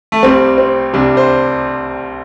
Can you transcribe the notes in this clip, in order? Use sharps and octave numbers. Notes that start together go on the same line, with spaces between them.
A3
C2 C3 G3 C4
C4
C2 C3 G3 D4
C5